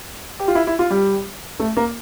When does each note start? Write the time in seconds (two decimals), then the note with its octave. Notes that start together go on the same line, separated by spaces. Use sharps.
0.40 G4
0.48 F4
0.55 E4
0.67 E4
0.79 F4
0.90 G3
1.59 A3
1.77 A#3